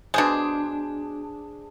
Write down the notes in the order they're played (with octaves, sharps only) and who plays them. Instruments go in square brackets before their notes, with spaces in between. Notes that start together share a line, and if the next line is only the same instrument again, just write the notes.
[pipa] B2 G#3 [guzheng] D4 G#4 C5